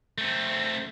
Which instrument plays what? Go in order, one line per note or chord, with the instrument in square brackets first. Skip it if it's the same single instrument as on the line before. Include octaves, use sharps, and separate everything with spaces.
[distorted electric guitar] A3 C4